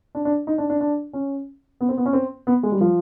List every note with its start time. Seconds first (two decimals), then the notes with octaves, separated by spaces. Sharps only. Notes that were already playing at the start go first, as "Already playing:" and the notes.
0.15 D4
0.25 D4
0.47 D#4
0.58 D4
0.70 D4
0.81 D4
1.13 C#4
1.81 B3
1.89 C4
1.97 B3
2.06 C#4
2.13 C4
2.47 B3
2.63 G#3
2.72 G3
2.81 F3